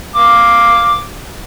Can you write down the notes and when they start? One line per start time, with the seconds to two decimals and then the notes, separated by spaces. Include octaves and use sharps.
0.16 F5 D6